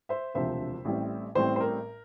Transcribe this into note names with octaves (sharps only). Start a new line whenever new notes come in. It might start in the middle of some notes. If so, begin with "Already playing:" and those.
C5 E5
E1 D2 C3 F3 C4 C5 E5
A1 A2 G3 C4
A1 A2 G3 C4 C5
C5
A#4